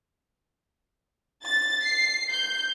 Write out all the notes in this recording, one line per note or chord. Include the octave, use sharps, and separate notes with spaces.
A6
C7
G6